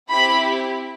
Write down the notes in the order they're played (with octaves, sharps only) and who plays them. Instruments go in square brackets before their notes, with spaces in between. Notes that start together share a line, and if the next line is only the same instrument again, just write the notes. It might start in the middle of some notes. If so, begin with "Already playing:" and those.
[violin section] C4 E4 G4 B5